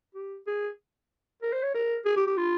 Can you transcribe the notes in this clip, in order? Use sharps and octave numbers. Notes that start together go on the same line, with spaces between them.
G4
G#4
A#4
C5
C#5
A#4
G#4
G4
G4
F4